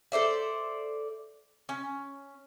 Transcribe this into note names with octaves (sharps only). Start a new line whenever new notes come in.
A4 C5 D5 E5
C#4